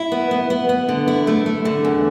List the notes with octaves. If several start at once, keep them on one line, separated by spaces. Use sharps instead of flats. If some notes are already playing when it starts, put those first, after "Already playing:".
Already playing: E4
B3
B3
B3
B3
D3
E4
A3
A3
D3
E2